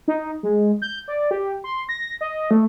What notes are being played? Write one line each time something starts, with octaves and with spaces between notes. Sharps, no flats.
D#4
G#3
G6
D5
G4
C6
A#6
D#5
A3